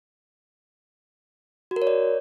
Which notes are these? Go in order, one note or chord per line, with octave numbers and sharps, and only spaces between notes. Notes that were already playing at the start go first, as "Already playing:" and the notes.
F#4
A#4
C#5
D5